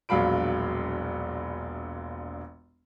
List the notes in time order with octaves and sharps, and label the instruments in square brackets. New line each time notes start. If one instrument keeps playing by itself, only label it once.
[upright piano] E1 A#1 F#3 F5 B5 D7